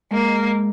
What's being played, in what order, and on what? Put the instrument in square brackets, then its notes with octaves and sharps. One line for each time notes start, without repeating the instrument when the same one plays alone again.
[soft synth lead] G#3 [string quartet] A#3